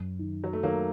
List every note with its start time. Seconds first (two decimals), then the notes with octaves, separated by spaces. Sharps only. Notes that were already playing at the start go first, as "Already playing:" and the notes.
Already playing: F#2
0.19 D#3
0.44 F#3
0.53 A3
0.63 D#3 F#3 A#3